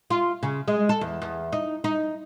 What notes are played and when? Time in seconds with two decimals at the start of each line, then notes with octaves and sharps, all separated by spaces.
0.10 F4
0.43 C#3
0.68 G#3
0.89 A4
1.01 E2
1.22 E2
1.53 D#4
1.84 D#4